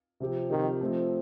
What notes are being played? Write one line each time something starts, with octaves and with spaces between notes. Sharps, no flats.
C3 F3 C4 G4
C3 D#3 F3 C4 G4
F3 A3 C4